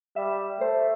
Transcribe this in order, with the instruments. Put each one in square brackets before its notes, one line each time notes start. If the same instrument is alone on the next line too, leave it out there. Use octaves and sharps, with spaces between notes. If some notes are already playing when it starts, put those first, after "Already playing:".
[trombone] G3 [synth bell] E5
[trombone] A3 [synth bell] C5